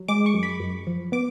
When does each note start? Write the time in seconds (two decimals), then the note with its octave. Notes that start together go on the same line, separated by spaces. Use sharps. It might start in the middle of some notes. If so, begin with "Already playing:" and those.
Already playing: F#3
0.08 G#3 D6
0.26 C#6
0.34 F#2
0.43 B5
0.60 F#2
0.87 F3
1.12 B3 D6